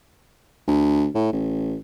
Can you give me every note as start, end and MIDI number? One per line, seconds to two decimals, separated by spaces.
0.68 1.07 38
1.15 1.30 45
1.33 1.76 33